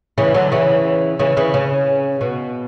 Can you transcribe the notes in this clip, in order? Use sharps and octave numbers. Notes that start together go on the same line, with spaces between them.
C#3 E3
D3 F#3
C#3 E3
C#3 E3
C#3 E3
C#3
B2